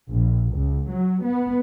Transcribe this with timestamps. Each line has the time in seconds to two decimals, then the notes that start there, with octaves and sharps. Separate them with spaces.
0.10 A#1
0.54 C#2
0.90 F#3
1.25 B3